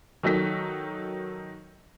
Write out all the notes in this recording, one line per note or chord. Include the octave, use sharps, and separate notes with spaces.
D#3 F#3 D#4 A4 B6